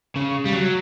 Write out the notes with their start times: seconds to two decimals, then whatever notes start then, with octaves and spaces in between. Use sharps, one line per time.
0.16 C#3
0.45 G3
0.53 F#3